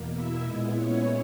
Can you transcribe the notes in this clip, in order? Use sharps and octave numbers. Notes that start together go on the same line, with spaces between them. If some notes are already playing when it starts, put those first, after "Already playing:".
Already playing: E2 B2 A#3
E4 E5
A#2 G#3 B3 D#4 E4 D#5
C#4 C#5